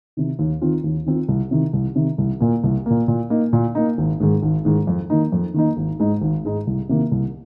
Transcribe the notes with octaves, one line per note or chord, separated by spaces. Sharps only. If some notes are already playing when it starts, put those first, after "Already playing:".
C3 D#3
D#2
D#3 C4 F4
D#2
D#3 C4 F4
C2
C3 D#3
C2
C3 D#3
C2
A#2 A#3
C2
A#2 A#3
A#2
A#3 D#4
A#2
A#3 D#4
G#1
G#2 D#3 G#3
G#1
G#2 D#3 G#3
F2
D#3 A#3 D#4
F2
D#3 A#3 D#4
G#1
G#2 G#3 D#4
G#1
G#2 G#3 D#4
C2
C3 D#3 A#3
C2